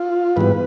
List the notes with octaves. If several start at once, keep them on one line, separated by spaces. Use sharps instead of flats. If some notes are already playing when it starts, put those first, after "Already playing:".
Already playing: F4
G#2 E3 G3 B3 B4